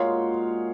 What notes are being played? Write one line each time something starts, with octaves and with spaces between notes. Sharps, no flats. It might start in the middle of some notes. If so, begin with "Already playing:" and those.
Already playing: A#2 G#3 D#4 F#4 C#5 F5